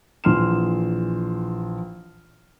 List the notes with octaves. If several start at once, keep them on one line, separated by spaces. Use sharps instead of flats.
A#1 E3 C6 F6 E7